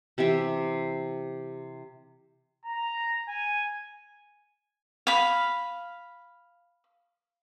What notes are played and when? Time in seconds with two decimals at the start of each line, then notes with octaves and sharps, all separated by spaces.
0.18 C3 E3 G4 E5
2.66 A#5
3.28 G#5
5.07 F5 B5